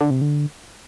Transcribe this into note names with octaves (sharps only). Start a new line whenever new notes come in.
D3
C3
D3